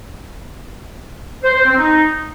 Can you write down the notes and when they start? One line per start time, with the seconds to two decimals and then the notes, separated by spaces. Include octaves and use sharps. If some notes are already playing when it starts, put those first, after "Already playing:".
1.43 C5
1.54 C5
1.65 C4
1.75 D#4